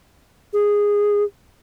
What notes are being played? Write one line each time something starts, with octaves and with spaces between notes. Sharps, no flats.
G#4